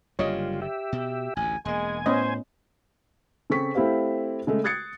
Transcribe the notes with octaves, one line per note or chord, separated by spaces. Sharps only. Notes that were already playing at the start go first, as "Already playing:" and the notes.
F#1 F#2 D3 G3 F4 C#5 D#5
G4 E5
B2
A1 D2 G#5
E1 G#3 A#3 G#5
A2 B3 C#4 C5 D#5
C#3 C4 A4 C#6 B6
A3 C4 E4 G4 C5 F5
C#3 G#3 A3
D#6 F#6 G#6 A6 C7 C#7